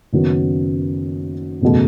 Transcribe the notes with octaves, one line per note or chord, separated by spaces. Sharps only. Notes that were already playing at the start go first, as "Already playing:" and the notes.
F#1 F#2 D#3 F#3 B3
F#1 E2 B2 A3